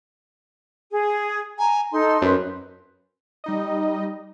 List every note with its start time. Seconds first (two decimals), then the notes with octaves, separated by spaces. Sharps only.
0.92 G#4
1.58 G#5 A#5
1.93 D#4 A4 C6
2.22 F#2 B4 C5
3.44 G3 D#4 D#5